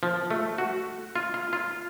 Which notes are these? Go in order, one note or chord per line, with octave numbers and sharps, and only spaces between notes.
F3
A3
F#4
F4
F4
F4